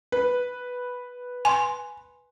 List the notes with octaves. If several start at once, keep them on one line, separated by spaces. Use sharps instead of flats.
B4
G#5 C6